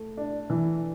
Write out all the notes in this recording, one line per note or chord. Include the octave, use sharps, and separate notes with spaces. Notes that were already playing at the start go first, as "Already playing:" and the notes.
Already playing: A3
D4
E3